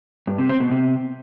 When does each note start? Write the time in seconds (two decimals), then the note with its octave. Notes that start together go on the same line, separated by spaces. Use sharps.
0.27 G2
0.38 C3
0.49 C4
0.60 B2
0.71 C3